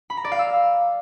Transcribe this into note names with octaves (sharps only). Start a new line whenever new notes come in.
B5
A#5
D5
F5
E6